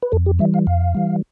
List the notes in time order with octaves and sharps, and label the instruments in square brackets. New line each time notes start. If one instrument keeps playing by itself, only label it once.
[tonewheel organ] B4
F2 A4
G4
E3 G3 E5
F5
F2 F5
E3 G3